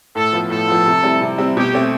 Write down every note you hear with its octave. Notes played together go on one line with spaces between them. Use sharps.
A2 A4
F3 B3 F4
A2 A4
F3 B3 F4
C3
G3 C4 E4
C3
G3 C4 E4
B2 G4
A3 C4